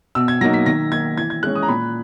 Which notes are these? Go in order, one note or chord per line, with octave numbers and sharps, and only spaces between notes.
B2 E6
G#6
F#3 A#3 D#4 A#6
B6
D#3 A#6
A#3 D#4 G#6
E3 G#6
G#6
G#3 C#4 F#6
D#6
A#5
A#2 B5